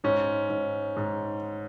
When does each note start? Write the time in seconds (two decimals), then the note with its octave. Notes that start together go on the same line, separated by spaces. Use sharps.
0.04 G#2 C#4
0.50 G#2
0.97 G#2